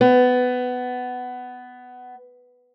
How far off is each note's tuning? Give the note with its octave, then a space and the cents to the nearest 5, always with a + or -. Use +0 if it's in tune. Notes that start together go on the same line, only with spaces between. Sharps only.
B3 +15